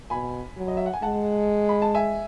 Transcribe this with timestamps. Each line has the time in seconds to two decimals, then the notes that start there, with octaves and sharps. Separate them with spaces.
0.10 B2 G#5 B5
0.57 F#3
0.68 D#5
0.77 E5
0.86 F#5
0.94 G#5
1.02 G#3 F#5 A5
1.69 B5
1.82 A5
1.95 E5 G#5